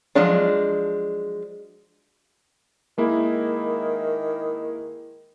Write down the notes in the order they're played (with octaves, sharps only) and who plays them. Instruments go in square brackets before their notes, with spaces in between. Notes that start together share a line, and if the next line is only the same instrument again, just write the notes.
[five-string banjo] F3 F#3 G#3 D4
[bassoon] D#3 [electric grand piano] G#3 A#3 E4